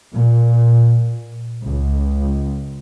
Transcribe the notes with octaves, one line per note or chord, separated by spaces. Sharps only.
A#2
C#2